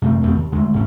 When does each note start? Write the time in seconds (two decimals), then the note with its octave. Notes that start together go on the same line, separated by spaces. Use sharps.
0.02 F#2 C3 A3 A#3
0.22 F2 B2 A3 C4
0.35 D#2
0.52 D3 G#3 A3
0.73 A1 G#2 C#4